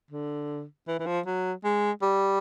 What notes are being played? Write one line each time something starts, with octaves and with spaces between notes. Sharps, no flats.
D3
E3
E3
F3
F#3
G#3
G3